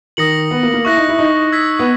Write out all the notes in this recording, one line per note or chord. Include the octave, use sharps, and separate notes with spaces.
D#3 D#6 A#6 C#7 F#7
B3
A#3
A#3
E4 C#6 F#6 A#6
D#4
E4
D#4
E6 G#6 B6
B3